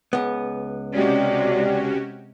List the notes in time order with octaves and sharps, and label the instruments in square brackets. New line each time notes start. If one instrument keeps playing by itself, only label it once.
[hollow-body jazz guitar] C#2 B3
[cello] C3 G#3 [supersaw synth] C#4 F#4 G4 [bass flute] D5